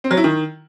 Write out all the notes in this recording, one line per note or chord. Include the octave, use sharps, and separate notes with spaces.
C4
F#3
E4
D#3